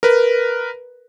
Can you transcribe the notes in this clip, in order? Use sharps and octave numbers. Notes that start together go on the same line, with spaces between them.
A#4 B4